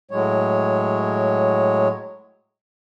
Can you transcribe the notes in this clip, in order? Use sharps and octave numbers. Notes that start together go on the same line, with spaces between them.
A2 F#3 G#3 C#5